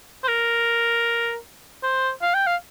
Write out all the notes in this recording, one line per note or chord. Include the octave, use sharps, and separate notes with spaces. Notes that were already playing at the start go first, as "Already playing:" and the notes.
C5
A#4
C5
F5
G5
F5